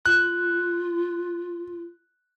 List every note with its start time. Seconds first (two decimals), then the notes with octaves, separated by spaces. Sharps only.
0.06 F4 F#6